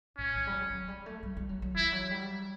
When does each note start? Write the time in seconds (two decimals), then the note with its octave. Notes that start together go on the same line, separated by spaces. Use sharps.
0.17 A2 C#4
0.35 E3
0.47 G3
0.53 F#3
0.70 F#3
0.88 G3
1.06 A3
1.23 G3
1.37 G3
1.49 F#3
1.62 F#3
1.76 E3 E4
1.93 F#3
2.11 G3